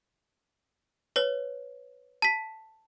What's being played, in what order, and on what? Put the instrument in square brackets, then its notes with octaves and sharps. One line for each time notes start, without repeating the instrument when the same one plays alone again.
[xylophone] B4 C#5
A5 B6